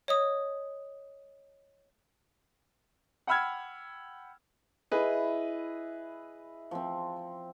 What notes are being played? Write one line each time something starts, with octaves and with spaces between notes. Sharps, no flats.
C#5 D#5 D#6
F#5 G5 B5 E6 F6 G#6
E4 G#4 B4 D#5
F3 C4